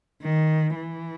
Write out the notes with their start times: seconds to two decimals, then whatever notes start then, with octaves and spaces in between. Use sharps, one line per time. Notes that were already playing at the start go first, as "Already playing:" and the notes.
0.22 D#3
0.75 E3